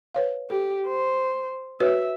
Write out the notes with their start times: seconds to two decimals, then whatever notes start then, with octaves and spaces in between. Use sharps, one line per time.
0.15 B4 C#5 F5
0.50 G4 A4
0.87 C5
1.80 F#4 B4 C#5 E5